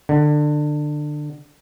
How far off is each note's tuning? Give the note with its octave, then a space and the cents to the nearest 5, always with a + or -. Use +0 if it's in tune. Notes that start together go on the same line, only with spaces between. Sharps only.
D3 +20